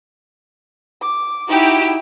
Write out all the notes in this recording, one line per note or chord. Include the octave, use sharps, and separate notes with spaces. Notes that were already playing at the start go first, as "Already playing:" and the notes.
D6
D#4 E4 F#4 G4